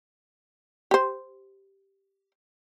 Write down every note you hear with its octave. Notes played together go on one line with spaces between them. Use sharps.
G4 C5